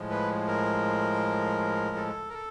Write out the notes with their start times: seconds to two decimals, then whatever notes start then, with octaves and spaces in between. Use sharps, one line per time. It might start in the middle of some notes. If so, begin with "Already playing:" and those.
Already playing: A2 F3 G#3
0.11 B4
0.48 A#4
1.96 A4
2.29 A#4
2.33 A4